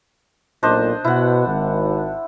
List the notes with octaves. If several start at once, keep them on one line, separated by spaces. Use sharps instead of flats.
B1 A#2 D4 C5 D#5
B2 E4 F#5
G#1